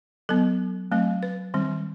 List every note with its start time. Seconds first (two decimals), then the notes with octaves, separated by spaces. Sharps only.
0.29 F#3 B3 A4
0.92 F#3 A3 C4
1.23 B4
1.54 D#3 G3 C4